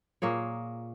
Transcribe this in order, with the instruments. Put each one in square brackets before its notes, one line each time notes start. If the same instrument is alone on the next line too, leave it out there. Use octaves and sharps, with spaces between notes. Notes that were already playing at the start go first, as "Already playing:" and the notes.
[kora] A#2 A#3 G#4 C#5